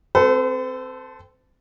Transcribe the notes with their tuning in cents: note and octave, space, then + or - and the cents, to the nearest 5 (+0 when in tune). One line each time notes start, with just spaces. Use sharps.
C4 +0 A4 +0 C5 -45